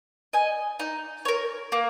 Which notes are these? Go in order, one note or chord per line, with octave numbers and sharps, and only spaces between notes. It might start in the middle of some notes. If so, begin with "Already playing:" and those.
D#5 G#5
D#4
A#4 C#5
A#3